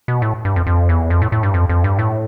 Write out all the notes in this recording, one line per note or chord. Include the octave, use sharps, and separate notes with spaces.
B2
A2
G2
F2
F2
E2
F2
A2
A2
G2
F2
F2
G2
A2